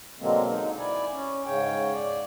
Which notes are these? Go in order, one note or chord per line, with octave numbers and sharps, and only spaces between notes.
B2 D3 F#3 G#3 A#3 C4
D#4
E4 D5 G#5
C#4
G#2 C#3 C#5 G5
D5